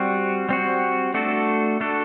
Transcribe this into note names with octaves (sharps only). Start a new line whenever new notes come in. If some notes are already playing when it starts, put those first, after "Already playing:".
Already playing: G3 C4 F#4
G3 C4 F#4
A3 D4 F#4 A4
A3 D4 F#4 A4